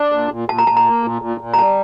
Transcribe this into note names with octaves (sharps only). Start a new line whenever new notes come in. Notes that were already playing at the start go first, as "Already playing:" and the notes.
Already playing: D4
A#2
A#2
A#2 A5
A#5
A#2 A5
A#5
A#3
A#2
A#2
A#2
A#5
G3 A5